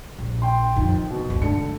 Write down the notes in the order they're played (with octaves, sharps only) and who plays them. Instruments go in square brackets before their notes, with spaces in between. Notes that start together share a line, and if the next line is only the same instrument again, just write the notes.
[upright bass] A#1
[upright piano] G5 C6
[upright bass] F2 [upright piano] D#3
[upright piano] B2
[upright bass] G1 C2
[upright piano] D3 A4 C#7 [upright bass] A3